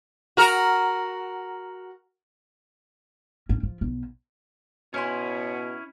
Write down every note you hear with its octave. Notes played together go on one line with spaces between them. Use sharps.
F#4 A#4
C#4
F3
B1
B2 C#4 E4 C5 C#5 G#5 C6